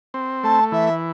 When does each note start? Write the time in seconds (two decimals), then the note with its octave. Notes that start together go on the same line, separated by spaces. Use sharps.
0.14 C4
0.44 A3 A5
0.72 E3 E5